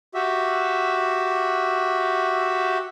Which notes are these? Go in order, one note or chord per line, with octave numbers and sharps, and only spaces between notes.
F#4 G4 E5